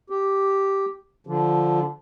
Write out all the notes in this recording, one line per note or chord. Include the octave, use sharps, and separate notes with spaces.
G4
D3 F3